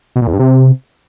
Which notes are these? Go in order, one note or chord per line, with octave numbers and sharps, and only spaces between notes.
B2
A#2
E2
G2
C3